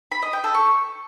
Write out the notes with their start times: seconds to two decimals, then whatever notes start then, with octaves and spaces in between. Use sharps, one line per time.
0.12 B5
0.22 D#5
0.33 G5
0.44 A4
0.55 C#6